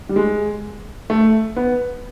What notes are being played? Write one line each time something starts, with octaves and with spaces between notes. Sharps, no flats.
G3
G#3
A3
B3